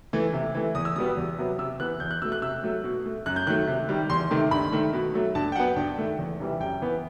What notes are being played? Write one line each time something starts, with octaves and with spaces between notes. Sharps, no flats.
E3 A3
C3
E3 A3
E2 D#6
E6
B2 G3 B3 D#6
E2
C3 F#3 B3
C3 E6
E3 B3 F#6
E2 G6
F#6
B2 A3 E6
F#6
C3 E6
F#3 A3
B2
A3
F#2 F#6
G6
D#3 F#3 A3 F#6
C3
D#3 G3
E2 C6
C3 D#3 A3
G2 B5
D#3 A3
B2
F#3 A3
G2 A5
G5
F#3 B3 F#5
G2 G5
D#3 A3
E2
C3 E3 G3
F#2 G5
E3 B3